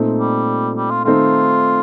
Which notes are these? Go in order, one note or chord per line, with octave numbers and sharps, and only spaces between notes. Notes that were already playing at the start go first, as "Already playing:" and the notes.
Already playing: A#2 A3 C4 D#4
G3
G3
F4
D#3 A3 C4 D#4 F4